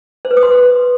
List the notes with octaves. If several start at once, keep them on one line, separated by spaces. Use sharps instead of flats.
C5
B4
D#6
C6